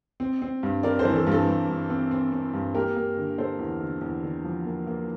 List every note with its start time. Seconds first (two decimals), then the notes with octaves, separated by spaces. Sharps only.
0.20 C4
0.42 C4
0.63 G2
0.83 C4 A#4 D5
0.99 A4 C5
1.05 E3
1.16 A4
1.27 G2 A4
1.47 G2
1.68 G2
1.90 C4
2.11 C4
2.32 C4
2.53 G2
2.74 A#3 G4 A#4
2.96 A#3
3.17 D3
3.38 A#3 A4 C5
3.59 E2
3.80 D3
4.01 E2
4.23 D3
4.44 F3
4.65 A#3
4.87 A#3